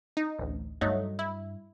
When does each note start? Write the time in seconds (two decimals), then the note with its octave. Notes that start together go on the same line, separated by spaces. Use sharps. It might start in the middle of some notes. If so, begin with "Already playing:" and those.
0.17 D#4
0.39 A1 D2
0.81 G2 F#3 A3 D#4
1.19 E4